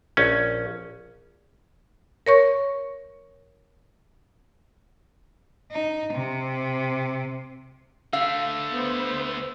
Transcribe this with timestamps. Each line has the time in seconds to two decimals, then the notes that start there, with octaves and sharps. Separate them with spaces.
0.17 A#1 C#4
2.26 A#4 C#5 C#6
5.71 D#4
6.13 C3
8.13 D3 A3 F5 E6
8.73 B3 C5